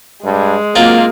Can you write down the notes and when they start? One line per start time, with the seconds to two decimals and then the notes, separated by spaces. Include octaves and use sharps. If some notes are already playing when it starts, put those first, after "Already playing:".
0.24 G2 G#3
0.76 F#3 A#3 C4 F4